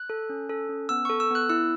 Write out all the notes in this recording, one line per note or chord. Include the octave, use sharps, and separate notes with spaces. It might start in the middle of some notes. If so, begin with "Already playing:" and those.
Already playing: F#6
A4
C#4
A4
C#4
B3 E6
A4 C#6
E6
B3 F#6
E4 E6